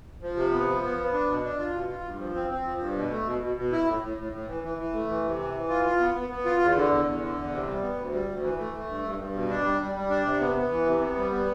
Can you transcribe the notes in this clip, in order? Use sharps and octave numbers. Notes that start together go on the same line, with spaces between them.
F3
C3
B3
F3
B3
B3
D4
B2
D4
F4
B2
F4
G2
F3
C4
C4
F3
G2
B2
A3
B2
B2
B2
E4
A2
A2
A2
A2
E3
E3
E3
A3
E3
C3
E3
E3
F4
F4
B3
B3
B3
F4
E2
D3
E2
E2
D3
E2
C3
G3
B3
D2
G3
D2
E3
A3
A3
G2
G2
G2
B2
D4
G3
G3
G3
D4
C3
B3
B3
E3
C3
B3
G3
B3